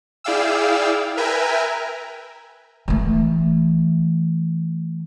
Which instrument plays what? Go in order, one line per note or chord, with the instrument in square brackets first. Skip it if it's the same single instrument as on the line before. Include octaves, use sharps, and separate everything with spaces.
[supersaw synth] E4 G#4 D5 F5 G5 E6
A#4 B4 E5 G5 G#5 A#5
[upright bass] E3 A3